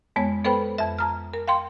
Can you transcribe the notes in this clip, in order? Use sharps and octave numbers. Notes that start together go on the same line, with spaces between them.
F2 G#3 B3 C#5
B3 A4 B4 C5 G5 B5
F2 E5
F2 A#5 F6
A#4
F5 G5 C6